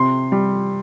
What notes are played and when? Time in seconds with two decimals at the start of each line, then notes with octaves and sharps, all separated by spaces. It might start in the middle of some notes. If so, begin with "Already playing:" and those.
Already playing: C3 C6
0.32 G3